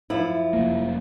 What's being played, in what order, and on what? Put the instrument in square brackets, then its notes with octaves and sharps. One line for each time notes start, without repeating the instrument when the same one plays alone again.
[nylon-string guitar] F#2 F3 E4
[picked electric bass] F1 A#3